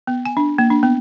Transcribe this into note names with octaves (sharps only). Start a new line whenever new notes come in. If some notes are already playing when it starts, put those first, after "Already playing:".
B3
G#5
D4
A#3
D4
B3